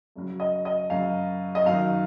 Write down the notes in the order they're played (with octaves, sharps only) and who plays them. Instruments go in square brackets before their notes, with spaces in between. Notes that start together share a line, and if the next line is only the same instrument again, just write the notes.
[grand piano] F#2 C#3 F#3
D#5
D#5
F#2 C#3 F#3 F5
D#5
F#2 D#3 F#3 F5